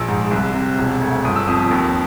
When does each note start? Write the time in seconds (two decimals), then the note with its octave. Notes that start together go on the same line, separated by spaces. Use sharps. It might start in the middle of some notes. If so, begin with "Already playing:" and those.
Already playing: A#1 E6
0.08 G#2
0.31 C2
0.54 C3
0.78 E1
1.02 D2
1.24 G1 D#6
1.36 E6
1.47 F2 D#6
1.59 D#6
1.71 D#2